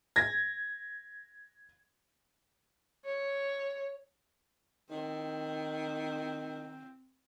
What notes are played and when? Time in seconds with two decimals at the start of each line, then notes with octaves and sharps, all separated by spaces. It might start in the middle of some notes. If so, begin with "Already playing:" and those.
0.16 G#6 A#6
3.06 C#5
4.91 D#3 C4